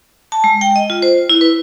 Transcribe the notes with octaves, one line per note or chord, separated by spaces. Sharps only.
A5
G#3
G5
D#5
F4
C5
E4
B4